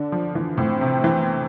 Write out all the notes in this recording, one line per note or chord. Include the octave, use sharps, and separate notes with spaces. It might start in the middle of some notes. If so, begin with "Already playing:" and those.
Already playing: D3 D4
F3
E3
A2 C4
C3
E3